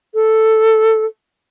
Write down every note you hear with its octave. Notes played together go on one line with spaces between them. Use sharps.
A4